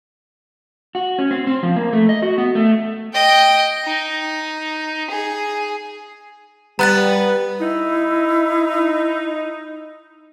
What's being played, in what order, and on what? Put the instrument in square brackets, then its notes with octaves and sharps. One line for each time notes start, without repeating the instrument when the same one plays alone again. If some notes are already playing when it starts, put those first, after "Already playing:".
[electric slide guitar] F#4
C#4
C4
C4
F3
A#3
A3
D#5
F#4
B3
A3
[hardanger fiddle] D#5 G5
D#4
G#4
[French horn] G3 [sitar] B3 [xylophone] A#5 F#6 A6
[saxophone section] D#4 [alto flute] E4